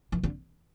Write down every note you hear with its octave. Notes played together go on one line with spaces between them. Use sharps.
E3
D3